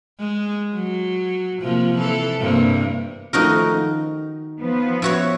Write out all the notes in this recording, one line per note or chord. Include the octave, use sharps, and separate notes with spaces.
G#3
F#3
C3 F3 A#3
E3 A4
G2 C3 A#3
D#3 F3 A3 D#4 F#4 A#4
D#3
F3 B3
E4 F#4 C#5